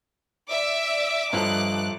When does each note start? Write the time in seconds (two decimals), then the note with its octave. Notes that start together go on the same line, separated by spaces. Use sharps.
0.48 D5 E5 D6
1.33 G1 G2 F3 G4 A4 D#5 F#6